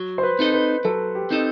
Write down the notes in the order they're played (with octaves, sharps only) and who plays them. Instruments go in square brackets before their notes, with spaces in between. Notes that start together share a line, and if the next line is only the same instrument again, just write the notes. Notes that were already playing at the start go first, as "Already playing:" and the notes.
Already playing: [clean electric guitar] F#3
[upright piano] C5
B4
[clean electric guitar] C4 D#4 A4 D#5
[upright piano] B4
[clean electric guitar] F#3 [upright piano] A4
[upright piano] G4
[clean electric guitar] C4 D#4 A4 D#5